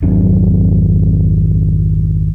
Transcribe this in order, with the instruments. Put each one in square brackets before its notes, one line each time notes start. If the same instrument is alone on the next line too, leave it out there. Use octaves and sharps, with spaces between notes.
[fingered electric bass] G#1 F2 F#3 D4